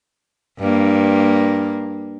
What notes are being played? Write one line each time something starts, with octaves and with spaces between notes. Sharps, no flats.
G2 A#3